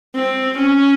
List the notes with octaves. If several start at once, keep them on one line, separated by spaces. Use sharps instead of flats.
C4
C#4